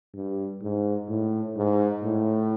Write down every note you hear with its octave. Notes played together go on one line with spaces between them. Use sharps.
G2
G#2
A2
G#2
A2